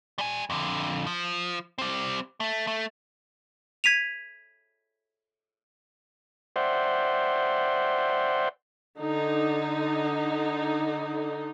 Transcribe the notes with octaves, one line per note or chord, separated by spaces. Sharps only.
G3 G#5
F2 D3
F3
G3 C4
A3
A3
G#6 B6 D#7 F7
C5 D5 E5 F#5 G5 C6
D3 D#4